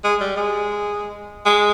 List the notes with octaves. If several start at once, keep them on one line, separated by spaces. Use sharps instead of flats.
G#3
G3
G#3
G#3